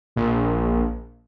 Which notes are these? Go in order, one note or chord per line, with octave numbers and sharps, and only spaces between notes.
A#1